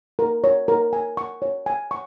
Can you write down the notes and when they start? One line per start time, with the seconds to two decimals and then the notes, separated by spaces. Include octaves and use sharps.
0.19 A#4
0.44 C#5
0.68 A#4
0.93 G#5
1.17 C#6
1.42 C#5
1.66 G#5
1.91 C#6